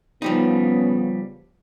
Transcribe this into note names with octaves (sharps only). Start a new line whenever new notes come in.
C#3 F3 G3 B3 D#4